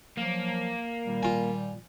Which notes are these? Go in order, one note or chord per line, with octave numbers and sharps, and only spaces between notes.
F3 F#3 A#3
A#2 D#3 G3
F4 G#5